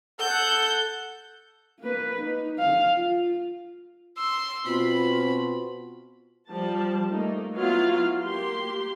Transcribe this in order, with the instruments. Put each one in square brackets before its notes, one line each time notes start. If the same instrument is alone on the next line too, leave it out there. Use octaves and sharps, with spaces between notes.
[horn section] A4 [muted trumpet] F#5 [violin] G6
[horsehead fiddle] A#3 B4
D#4
F5
F4
[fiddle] C6 [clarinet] E6
[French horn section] B2 C4 [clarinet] F4 [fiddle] B5
[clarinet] F4
[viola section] F3 G3 A5
A3 A#3 D#4
F#3 B3 E4 F4 F5
A#3 G4 C6